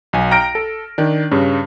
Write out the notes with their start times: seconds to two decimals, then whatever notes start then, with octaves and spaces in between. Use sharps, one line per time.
0.13 B1 G#5
0.31 G5 A#5 F6 A#6 D7
0.55 A4
0.98 D#3 D4
1.31 G2 C#3